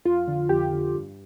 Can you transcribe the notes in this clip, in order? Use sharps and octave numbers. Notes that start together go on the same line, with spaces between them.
F2 F4
D3
F2 G4
D3
G2